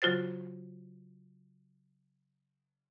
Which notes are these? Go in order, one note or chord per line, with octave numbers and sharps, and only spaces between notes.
C#3 F#3 F4 F#4 C5 A6